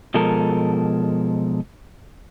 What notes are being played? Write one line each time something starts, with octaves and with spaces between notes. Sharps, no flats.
B2 F3 G#3 A4 A#4